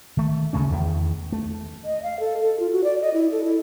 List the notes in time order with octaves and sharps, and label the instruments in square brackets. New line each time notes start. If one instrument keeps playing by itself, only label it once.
[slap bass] D#3 A3
D2 C#3 A3 C#4
E2 D#3
A3
[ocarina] D#5
F5
A4
A4
F4
F#4
D5
D#5
E4
A4
E4